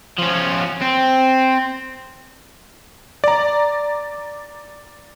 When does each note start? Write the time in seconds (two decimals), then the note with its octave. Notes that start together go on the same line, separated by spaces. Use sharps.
0.19 F3 C#4
0.82 C4
3.24 D5 A#5